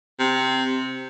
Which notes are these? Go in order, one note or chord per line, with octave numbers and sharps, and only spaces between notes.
C3